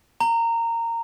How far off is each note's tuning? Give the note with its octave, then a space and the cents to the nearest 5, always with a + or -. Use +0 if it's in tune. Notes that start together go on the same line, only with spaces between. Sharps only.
A#5 -15